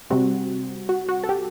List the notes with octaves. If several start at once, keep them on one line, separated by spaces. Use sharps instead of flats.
C3 G3 C4 F#4
F#4
F#4
A4
G4